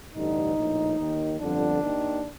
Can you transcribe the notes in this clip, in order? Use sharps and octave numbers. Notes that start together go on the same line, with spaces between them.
A1 G2 D3 D#4
A#1 A2
D#2 D#3
G1 F2 D3 D4
D#2 D#3